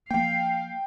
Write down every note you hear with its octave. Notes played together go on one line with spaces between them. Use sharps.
F3 A#3 F5 G5